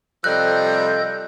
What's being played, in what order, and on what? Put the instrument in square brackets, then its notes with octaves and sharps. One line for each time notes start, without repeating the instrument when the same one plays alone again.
[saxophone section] C3 F3 G3 [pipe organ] A4 D#5 G6 [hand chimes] F#6